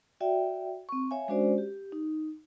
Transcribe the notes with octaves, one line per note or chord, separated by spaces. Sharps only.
F#4 D5 E5 G5
C4 C#6
C#5 E5 F5 G#5
G#3 C#4 D4 F#4 C5 D5
G4
D#4